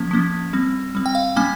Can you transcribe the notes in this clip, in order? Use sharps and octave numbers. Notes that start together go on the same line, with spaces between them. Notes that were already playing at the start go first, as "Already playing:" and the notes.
Already playing: F3 A#3 C#4
F3 A#3 C#4
G3 C4
G3 C4
G5
F5
G3 A#3 C#4 G#5